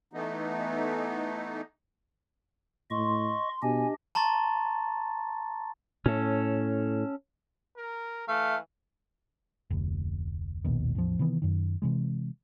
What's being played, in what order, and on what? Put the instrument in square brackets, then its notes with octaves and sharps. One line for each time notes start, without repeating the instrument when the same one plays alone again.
[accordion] E3 A3 B3 D#4
[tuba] A2 [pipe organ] D#5 C#6 [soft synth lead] C6
[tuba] B2 [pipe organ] D4 G4 D#5 [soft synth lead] G#5
[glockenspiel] A5 A#5 C6 C#6 A6
[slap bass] A2 [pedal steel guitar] C#4 A4
[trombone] A#4
[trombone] E3 [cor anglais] A3 [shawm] F5
[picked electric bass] F1 D2
E1 A#1 D#2 B2
A1 E2 F3
C3 D#3 E3 B3
F#2 D#3
C3 E3 G#3